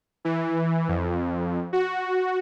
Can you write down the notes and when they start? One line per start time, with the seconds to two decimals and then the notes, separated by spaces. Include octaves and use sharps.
0.25 E3
0.88 F2
1.73 F#4